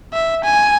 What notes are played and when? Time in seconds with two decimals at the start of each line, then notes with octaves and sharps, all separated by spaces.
0.13 E5
0.44 G#5